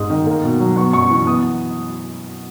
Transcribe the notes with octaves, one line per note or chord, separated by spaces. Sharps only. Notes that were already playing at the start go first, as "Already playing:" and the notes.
Already playing: G#2 G#3 D#6
D#3
A#3
B2
F#3
B3 C#6
F#2 C#6
E3 C#6
B3 D#6